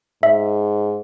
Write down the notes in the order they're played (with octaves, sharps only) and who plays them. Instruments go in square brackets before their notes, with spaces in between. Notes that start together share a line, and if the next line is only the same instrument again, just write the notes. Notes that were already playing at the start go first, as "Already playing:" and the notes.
[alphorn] G#2 [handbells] E5